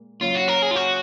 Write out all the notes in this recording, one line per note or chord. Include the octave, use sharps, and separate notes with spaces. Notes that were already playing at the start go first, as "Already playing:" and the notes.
Already playing: A#2 G#3
C#3 F#3 A#3 C#4 F4
F#4
A#4
G#4
F4
F#4